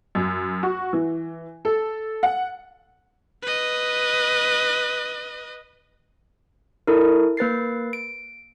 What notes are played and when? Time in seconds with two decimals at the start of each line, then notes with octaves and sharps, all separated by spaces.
0.15 F#2
0.63 F#4
0.93 E3
1.65 A4
2.23 F#5
3.42 B4 D#5
6.87 E4 A4 A#4
7.37 A#3 B4 A6 C7
7.93 D7